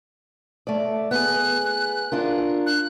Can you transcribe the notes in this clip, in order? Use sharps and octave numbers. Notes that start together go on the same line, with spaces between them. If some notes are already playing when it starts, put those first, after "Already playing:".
A3 D5
B3 G#4 F#6
D4 F4 A#4
F#6